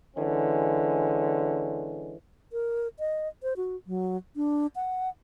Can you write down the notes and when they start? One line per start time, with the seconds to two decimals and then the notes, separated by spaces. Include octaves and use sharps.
0.17 D3 E3 G#3 C#4
2.53 A#4
2.99 D#5
3.43 C5
3.57 F#4
3.87 F#3
4.36 D4
4.76 F#5